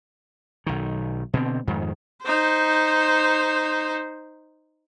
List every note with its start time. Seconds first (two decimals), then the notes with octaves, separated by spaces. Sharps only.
0.66 B1 D#3
1.34 B2 D3 C4
1.68 F2 G#2 D#3
2.23 D#4 C5